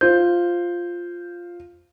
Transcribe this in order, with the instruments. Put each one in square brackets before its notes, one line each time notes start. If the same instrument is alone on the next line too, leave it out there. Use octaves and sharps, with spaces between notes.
[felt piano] F4 C5 [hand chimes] G6